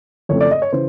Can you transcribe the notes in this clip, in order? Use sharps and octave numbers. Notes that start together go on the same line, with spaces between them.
F2 C#3 E3 A3 C4 C#5
D5
D#5
C#5
C#3 E3 C5